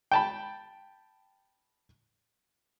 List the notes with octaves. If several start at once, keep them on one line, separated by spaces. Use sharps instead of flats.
G5 A5 B5